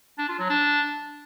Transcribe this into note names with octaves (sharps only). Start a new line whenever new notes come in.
D4
F4
F#3
D4